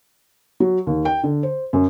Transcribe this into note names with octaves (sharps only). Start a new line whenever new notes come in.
F#3
D#2
G5
D3
C5
F#2